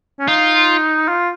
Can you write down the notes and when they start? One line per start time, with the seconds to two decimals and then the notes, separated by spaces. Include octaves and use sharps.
0.19 C#4
0.28 D#4 F4
1.08 F4